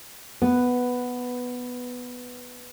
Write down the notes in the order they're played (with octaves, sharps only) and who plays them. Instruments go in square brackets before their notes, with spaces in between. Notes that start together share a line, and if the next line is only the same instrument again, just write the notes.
[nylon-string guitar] B3 [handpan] B4